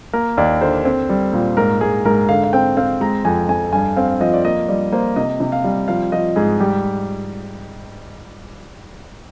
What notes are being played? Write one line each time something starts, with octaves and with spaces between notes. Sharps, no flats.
A#3 A#4
D#2 D5
D3 C5
C4
G3
A#2
G#2 A#4
G#2 G#4
G#2 A#4
D3 F5
F5
C4 G5
C4 F5
G#3 A#5
F2 G#5
F2 G#5
G2 G#5
C4 F5
F3 D#5
D5
A#3 D#5
G3 D5
A#3 C5
C3 D#5
C3
F5
G3
F3 F5
F3 D#5
G#2 G#4
G3 G4